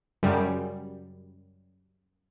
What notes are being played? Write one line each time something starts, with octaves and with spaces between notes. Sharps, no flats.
F#2 C#3 G3